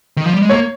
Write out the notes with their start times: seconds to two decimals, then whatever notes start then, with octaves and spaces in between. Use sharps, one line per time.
0.17 D#3
0.26 F3
0.34 G3
0.42 G#3
0.49 A#3 C#5